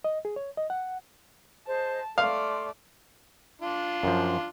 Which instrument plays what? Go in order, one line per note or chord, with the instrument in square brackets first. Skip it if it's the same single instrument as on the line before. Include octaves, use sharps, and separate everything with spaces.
[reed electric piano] D#5
G#4
C#5
D#5
F#5
[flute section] G#4 C5 D#5 [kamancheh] A5
[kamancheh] A3 D5 [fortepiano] F5 [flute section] C6
[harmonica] D4 F4
[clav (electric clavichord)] F#2 F3